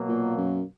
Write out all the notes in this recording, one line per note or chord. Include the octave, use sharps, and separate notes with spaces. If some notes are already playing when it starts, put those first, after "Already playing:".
Already playing: B2 F#3 A#3
A#2
F#2